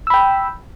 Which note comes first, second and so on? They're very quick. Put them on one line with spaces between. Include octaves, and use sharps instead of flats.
E6 B5 G5